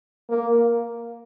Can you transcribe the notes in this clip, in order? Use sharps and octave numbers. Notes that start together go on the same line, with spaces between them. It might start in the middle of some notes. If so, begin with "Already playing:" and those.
A#3